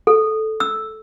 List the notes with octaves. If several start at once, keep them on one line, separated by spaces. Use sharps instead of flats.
A4
E6